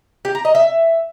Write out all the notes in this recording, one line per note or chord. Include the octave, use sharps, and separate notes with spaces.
G4
A#5
D#5
E5